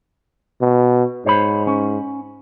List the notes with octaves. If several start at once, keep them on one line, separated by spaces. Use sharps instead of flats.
B2
G#2 C5 C#5 B5
C#4